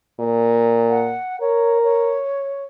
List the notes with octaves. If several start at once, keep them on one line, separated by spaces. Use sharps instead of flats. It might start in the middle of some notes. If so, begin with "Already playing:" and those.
A#2
F#5
A#4 C#5
C#5